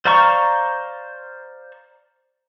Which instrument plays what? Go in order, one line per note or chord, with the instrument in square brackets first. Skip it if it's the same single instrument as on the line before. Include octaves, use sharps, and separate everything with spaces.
[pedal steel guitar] C5 D5 F5 A#5 C#6